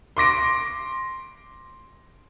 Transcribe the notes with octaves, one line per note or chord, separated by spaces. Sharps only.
C6 D6 A#6 D7